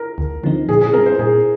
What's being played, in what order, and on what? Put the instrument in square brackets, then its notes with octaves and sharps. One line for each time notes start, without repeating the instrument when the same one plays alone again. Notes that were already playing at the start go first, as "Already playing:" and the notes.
Already playing: [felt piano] A#4
[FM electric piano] D2
D3 F3 C4 D#4
[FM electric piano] A#2 [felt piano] G#4
[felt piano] G#4
[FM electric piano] G3 C4 [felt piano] A#4
[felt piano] C5
[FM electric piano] A#2 [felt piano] G#4